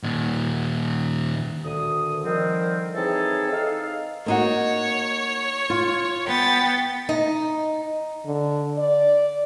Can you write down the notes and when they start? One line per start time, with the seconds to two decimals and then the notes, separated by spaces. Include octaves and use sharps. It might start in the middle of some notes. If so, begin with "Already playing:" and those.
0.03 A#2 D#3
1.65 D2 D#3 D#6
2.24 D3 D#3 F3 G3 C4 A#4
2.95 E3 C4 D#4 G#4 A4 C#5
3.51 D#4 A4 F5
4.26 A#3 D#4 F#4 C#5
5.70 F4
6.27 B3 G5 A6
7.09 D#4
8.26 D3
8.78 D5